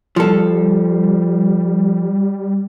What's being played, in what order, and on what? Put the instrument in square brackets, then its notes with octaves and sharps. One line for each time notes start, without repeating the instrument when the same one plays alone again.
[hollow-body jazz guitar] F3 A4 [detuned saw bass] G3